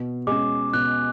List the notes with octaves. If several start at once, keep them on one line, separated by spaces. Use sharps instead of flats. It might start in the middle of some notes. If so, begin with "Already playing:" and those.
Already playing: B2
G#3 C#4 D6
B2 F#6